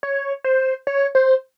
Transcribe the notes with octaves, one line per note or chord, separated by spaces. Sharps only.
C#5
C5
C#5
C5